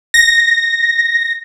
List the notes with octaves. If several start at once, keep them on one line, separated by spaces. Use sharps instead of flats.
A#6